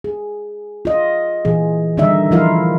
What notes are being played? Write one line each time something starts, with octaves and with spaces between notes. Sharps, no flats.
G#4
F4 D#5
A#2 E3 G#4
D3 D#3 G3 D#4 D#5 E5
E3 F3 E4 F4 A#4 F5